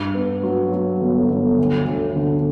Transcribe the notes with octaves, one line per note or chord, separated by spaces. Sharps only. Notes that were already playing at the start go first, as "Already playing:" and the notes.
Already playing: G2
B3
F#3
F#3
G1
G1
D2
D2
D3